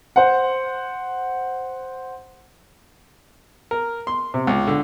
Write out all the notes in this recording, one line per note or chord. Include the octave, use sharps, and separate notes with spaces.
C5 F#5
A#4
C6
C3
C#2
D3